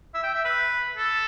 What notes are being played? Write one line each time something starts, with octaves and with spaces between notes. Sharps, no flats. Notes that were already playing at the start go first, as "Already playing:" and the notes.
E5
G5
E5
B4
A4